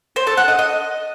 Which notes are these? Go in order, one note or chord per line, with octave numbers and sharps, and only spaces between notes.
C5
A4
F#5
D#5
D#5